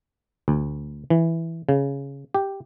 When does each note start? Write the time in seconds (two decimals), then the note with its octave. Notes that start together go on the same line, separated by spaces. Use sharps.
0.48 D2
1.10 E3
1.69 C#3
2.35 G4